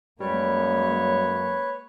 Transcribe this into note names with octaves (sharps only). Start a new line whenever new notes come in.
F#2 G3 G#3 A#3 B4 C#5